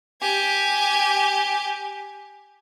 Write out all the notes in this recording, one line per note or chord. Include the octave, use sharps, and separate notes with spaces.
G4 G#5